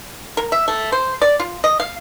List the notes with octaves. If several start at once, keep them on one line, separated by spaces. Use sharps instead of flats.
A#4
E5
A3
C5
D5
F4
D#5
F5